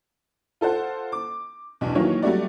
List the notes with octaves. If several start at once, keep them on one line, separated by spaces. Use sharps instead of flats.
F4 A4 C5 F#5
D6
B1 E2 D4
D#3 E3 F#3 A#3 F4 C#5
F#3 G3 A3 F#4 D5